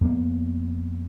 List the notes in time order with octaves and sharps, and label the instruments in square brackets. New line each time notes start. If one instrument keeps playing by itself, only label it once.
[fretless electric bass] F2 A#3 B3